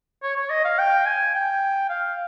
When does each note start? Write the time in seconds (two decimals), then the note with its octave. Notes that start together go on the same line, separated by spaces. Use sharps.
0.23 C#5
0.37 C#5
0.50 D#5
0.64 F5
0.78 G5
1.05 G#5
1.34 G5
1.89 F5